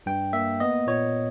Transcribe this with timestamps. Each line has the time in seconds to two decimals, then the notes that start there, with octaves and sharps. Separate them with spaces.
0.06 G2 G5
0.33 A#3 E5
0.60 B3 D#5
0.87 A#2 C#5